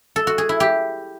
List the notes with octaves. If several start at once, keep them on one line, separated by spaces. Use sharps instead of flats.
A4
F#4
G#4
E4
G4